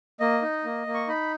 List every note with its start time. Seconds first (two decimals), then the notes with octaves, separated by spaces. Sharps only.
0.20 A#3 D#5
0.42 D#4
0.64 A#3
0.87 A#3
0.94 C#6
1.08 D#4 B5